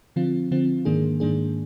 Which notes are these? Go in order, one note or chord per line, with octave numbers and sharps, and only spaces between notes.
D3 F3 C4 F4
D3 F3 C4 F4
G#2 D#3 A#3 D4 G#4
G#2 D#3 A#3 D4 G#4